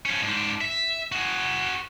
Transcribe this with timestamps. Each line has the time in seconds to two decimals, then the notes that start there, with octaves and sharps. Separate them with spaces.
0.06 F3 C#4
0.22 G#2 D4
0.61 E5
1.12 F#4 G#4